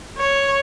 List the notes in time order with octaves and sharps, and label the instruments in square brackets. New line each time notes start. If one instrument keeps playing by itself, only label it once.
[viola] C#5